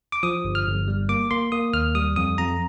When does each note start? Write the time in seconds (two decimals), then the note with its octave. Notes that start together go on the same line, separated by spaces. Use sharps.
0.12 D6
0.23 F3 D#6
0.45 G1
0.55 F6
0.67 G1
0.88 G3
1.09 A#3 D6
1.31 A#3 C6
1.52 A#3 D#6
1.74 D#2 F6
1.95 G3 D#6
2.16 F2 D#6
2.38 F2 A#5